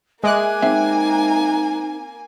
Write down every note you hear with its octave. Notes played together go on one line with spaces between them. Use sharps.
G#3 A#3 E5 G#5 D6 F#6
C4 D#4 E5